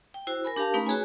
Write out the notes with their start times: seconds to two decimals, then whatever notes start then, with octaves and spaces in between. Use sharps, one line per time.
0.14 G5
0.27 E4 F#4 C5
0.45 A#4 G#5 B5
0.56 D4 G4 A#4 F5 A5
0.74 A3 C#4 D#4 B4 A#5 B5
0.86 F#4 G#4 C#5 G#5